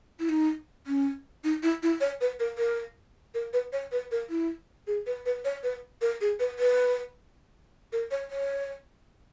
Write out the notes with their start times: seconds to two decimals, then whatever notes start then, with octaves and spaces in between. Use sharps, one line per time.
0.19 E4
0.29 D#4
0.87 C#4
1.44 D#4
1.63 E4
1.83 E4
2.01 C#5
2.21 B4
2.40 A#4
2.58 A#4
3.34 A#4
3.53 B4
3.73 C#5
3.92 B4
4.11 A#4
4.30 E4
4.87 G#4
5.06 B4
5.26 B4
5.45 C#5
5.63 B4
6.01 A#4
6.21 G#4
6.39 B4
6.59 B4
7.93 A#4
8.11 C#5
8.31 C#5